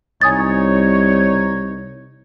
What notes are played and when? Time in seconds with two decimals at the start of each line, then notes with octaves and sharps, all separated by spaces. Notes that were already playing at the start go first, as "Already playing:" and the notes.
0.21 C2 D#4 C#5 G#5 D#6 A6